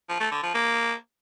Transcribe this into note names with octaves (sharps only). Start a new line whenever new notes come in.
F3
A3
D3
F3
A#3